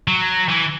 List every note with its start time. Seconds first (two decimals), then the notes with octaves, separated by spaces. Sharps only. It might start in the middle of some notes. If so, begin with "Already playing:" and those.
0.08 F#3
0.48 E3